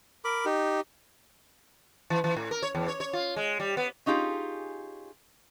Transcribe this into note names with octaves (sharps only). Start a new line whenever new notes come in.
A#4 B5 D6
D#4 G4
E3
E3
A2
A#4
C#5
E2
C#5
C#5
F4
G#3
G3
B3
C#4 D#4 F4 G4 G#4